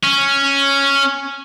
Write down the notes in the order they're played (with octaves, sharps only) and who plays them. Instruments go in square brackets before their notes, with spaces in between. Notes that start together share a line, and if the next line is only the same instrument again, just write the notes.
[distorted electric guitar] C#4